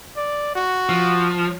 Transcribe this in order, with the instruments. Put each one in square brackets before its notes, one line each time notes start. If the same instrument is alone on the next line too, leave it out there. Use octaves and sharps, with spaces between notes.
[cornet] D5
F#4
[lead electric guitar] F3